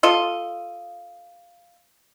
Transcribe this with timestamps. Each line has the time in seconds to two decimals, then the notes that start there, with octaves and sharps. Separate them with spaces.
0.03 F4 A4 D#5